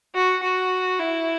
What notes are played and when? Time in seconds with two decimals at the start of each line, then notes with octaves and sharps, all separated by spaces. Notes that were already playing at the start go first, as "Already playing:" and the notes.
0.15 F#4
0.43 F#4
1.00 E4